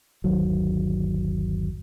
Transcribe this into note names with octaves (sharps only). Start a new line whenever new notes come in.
G1 D#2 D#3 F#3